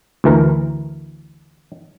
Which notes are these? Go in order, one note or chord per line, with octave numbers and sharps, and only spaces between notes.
D2 E3 A#4